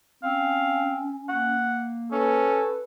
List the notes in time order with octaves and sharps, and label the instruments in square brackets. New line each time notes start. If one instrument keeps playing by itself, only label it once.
[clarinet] C4 [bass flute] C#4 [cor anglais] F5
[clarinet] A#3 [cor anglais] F#5
[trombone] C#4 [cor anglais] A4 [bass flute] B4